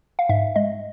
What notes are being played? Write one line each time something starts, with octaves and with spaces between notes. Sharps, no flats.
F5
G#2 E5
G#3 D#5